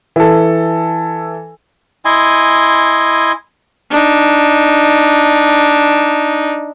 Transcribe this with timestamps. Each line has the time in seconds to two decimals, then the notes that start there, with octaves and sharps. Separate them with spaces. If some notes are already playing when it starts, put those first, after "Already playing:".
0.16 E3 A4
2.05 E4 D#5 G#5 C6
3.91 D4 D#4